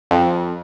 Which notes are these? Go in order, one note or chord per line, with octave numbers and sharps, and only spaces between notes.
F2